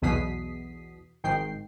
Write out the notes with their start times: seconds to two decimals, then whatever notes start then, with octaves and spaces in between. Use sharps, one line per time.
0.02 B1 E2 B2 D#6 B6 C7
1.24 G#1 G#2 D#3 G5 C7